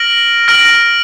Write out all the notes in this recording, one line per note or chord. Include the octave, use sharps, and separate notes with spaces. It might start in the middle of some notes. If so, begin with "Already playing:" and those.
Already playing: F6 A#6 D7 F#7
F6 A#6 D7 F#7